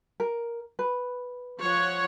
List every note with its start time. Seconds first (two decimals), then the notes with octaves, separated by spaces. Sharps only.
0.20 A#4
0.79 B4
1.60 F3 C#5 F#5